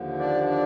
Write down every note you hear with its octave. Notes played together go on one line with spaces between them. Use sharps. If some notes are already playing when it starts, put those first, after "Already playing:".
Already playing: D#2 D3 F3
D4 D5
D4 D5